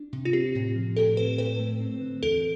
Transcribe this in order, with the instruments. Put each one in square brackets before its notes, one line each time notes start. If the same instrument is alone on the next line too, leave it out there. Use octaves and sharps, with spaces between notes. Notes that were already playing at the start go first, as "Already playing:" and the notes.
Already playing: [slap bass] D4
C3
[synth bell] F4
[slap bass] C4 [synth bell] G4
[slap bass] A2
F3
[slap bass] A2 [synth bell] A4
[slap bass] C4 [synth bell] B4
[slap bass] A2 [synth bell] B4
[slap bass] A3
C4
D3
[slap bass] E2 [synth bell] A4